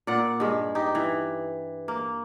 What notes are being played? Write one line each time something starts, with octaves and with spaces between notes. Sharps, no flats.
A#2 D5 F#5
G2 G#3
D#4 G4
E3
A#3